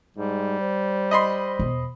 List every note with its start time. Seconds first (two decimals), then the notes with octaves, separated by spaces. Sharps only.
0.17 G#2 G3
0.61 C5
1.11 D#5 B5 C6
1.59 E2 B2